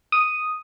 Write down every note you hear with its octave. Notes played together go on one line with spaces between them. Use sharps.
D#6